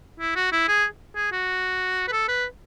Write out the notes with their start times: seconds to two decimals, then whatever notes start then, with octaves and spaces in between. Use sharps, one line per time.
0.20 E4
0.36 F#4
0.52 E4
0.68 G#4
1.16 G#4
1.32 F#4
2.08 B4
2.12 A4
2.28 B4